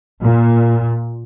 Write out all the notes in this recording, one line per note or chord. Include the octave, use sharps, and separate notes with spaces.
A#2